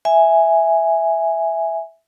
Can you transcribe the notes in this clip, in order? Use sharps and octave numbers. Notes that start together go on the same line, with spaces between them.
E5 G#5